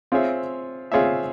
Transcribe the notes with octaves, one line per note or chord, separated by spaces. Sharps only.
C4 F4 G#4 C#5 E5
C4 F4 G#4 C#5 E5